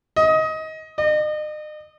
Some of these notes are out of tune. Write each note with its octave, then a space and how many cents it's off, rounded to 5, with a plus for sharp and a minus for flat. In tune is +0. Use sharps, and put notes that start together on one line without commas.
D#5 +20
D#5 -40